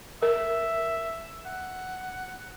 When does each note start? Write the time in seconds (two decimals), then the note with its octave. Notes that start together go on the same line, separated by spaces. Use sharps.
0.23 A#4 E5
1.46 F#5